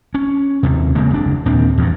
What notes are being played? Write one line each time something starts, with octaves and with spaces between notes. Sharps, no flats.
C#4
D#2 C3
C#3 G#3 A#3 C4
F#1 D4
D#2 A#2 C4 D4
E2 G2